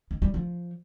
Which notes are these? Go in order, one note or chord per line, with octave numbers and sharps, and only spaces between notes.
G#3
G3
F3